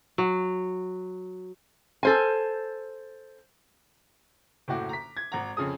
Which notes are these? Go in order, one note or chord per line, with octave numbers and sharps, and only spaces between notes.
F#3
A4 C5 G#5
F#1 A2 F#4 D6
A#5 B6
G#6
G#1 F#5 A#5
F2 C#3 F3 G#4 D#6